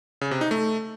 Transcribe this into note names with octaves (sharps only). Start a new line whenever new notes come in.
C#3
C3
D#4
A3